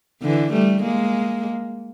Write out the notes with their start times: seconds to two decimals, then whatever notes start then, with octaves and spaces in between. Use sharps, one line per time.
0.22 D3 E3
0.53 G3 A3
0.82 G#3 A#3